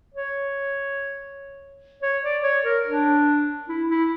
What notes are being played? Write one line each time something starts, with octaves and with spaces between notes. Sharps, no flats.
C#5
C#5
D5
C#5
A#4
D4
E4
E4